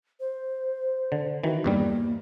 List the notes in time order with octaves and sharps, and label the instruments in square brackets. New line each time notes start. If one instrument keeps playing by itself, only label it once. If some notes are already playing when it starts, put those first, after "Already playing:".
[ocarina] C5
[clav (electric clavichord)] D3
[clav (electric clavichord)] D#3 E3 [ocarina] F#4
[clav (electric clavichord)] E2 G2 G3 [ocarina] A#3